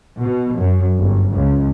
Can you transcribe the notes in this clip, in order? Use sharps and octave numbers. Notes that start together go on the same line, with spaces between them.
B2
F#2
G1
C#2